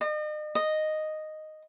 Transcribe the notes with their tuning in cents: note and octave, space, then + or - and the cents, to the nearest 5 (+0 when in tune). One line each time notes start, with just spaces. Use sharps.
D#5 -40
D#5 -5